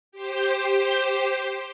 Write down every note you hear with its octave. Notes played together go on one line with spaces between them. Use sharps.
G4 C5